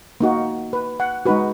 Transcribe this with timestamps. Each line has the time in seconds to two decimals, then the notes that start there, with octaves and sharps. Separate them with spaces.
0.20 A#3 D#4 F#4
0.73 B4
1.00 F#5
1.25 G#3 D#4 F#4 B4